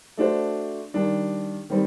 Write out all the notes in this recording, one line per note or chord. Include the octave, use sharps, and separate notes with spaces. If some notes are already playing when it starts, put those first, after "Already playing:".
A3 D4 F#4 C5
D#3 G3 D4
D#3 G3 C4